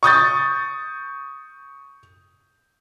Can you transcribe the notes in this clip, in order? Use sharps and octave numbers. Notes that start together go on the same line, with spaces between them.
C#6 D#6 G6 A6